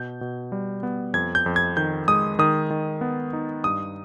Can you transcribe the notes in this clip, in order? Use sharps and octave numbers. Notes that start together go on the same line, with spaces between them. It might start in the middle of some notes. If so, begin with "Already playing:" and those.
Already playing: B2 G6
B2
G3
B3
F2 G#6
G6
F2
G#6
D#3 G6
G#3 D#6
D#3 D#6
D#3
B3
D#4
G2 D#6